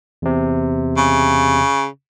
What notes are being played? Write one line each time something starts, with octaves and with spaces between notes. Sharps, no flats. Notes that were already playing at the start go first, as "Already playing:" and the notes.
E2 C3
C#3